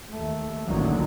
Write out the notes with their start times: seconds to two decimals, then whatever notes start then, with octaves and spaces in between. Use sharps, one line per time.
0.12 D#2 A3
0.67 A1 D2 A#2 D3 D#3 F#3